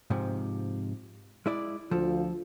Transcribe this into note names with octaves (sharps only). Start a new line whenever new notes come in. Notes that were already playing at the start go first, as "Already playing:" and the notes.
G#2 C3 F3
G#3 E4 D5
D2 F3 F4 A4